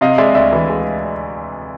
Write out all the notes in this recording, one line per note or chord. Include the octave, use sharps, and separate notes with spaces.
C3 D#5 F5
G#3 D5 E5
D2 D5 E5
E3
G#3